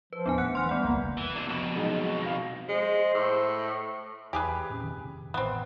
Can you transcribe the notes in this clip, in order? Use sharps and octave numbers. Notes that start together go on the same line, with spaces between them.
F3 B4
D#1 E2 B3 D4 G#5
A3 F#5 F#6 C#7
E3 C6 F6
G3 B3 F#5
F1 C#2 A#3
E3
C3 D4
F2 B2
F#3 G#3 D#4
F5 A#6
G#3 C5
A2
E2 G4 G#4 B4
A#2 C4 C#4
F1 F#2 D#3
A1 B3 C4